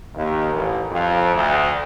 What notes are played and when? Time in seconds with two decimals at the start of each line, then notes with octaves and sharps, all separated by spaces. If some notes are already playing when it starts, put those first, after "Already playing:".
0.14 D#2
0.54 A1
0.92 F2
1.35 D2